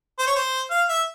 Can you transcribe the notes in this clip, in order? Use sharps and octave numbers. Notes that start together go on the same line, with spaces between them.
C5
C#5
C5
F5
E5